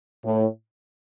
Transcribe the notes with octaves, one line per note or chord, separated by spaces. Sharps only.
A2